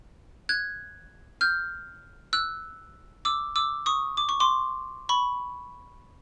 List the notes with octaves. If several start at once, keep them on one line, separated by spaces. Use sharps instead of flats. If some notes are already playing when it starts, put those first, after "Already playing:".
F#6 G#6
F6 G6
E6 F#6
D6 E6
D6 E6
C#6 D#6
D6
C#6
C6 D6
B5 C#6